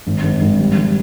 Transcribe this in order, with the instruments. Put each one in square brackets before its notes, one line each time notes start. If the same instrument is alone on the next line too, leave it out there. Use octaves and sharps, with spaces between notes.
[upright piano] G#1
G#1
G#1
G3
G3